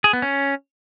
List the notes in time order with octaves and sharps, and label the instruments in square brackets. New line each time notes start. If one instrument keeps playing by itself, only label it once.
[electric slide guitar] G#4
B3
C#4